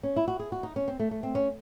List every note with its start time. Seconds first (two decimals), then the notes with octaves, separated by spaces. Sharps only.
0.03 C#4
0.16 E4
0.28 F#4
0.39 G#4
0.52 F#4
0.63 D#4
0.76 C#4
0.88 C4
0.99 A3
1.11 A3
1.23 C4
1.35 C#4